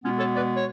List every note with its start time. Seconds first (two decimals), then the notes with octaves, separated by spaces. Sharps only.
0.04 B2 G#3 B3 C#4 F4
0.19 A4 C#5
0.35 B4 D5
0.56 C#5